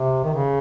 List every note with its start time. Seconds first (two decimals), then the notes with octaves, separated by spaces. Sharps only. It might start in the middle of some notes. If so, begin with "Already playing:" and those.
Already playing: C3
0.24 D#3
0.34 C#3